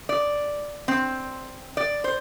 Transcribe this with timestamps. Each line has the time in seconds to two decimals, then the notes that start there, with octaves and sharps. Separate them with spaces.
0.09 D5
0.88 C4
1.77 D5
2.04 C5